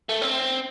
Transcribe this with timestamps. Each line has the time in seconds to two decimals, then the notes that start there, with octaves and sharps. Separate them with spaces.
0.09 A3
0.22 C4